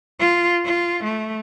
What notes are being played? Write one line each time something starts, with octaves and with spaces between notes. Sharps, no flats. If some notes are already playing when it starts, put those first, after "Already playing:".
F4
F4
A3